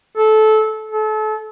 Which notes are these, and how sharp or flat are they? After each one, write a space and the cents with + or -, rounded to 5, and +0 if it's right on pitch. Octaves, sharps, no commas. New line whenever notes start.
A4 -20
A4 -35